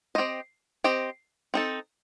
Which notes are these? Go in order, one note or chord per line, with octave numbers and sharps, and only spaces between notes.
C4 G4 C5 D#5
C4 G4 C5 D#5
C4 D#4 A4